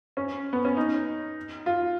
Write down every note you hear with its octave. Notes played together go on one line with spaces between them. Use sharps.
C#4
B3
C#4
D#4
F4